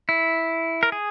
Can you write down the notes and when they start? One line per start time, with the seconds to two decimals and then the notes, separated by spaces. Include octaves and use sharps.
0.09 E4
0.83 A#4
0.92 G#4